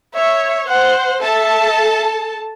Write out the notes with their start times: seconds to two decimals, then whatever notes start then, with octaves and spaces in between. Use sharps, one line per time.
0.15 C#5 E5
0.68 C5 F#5
1.21 A4 E5 A5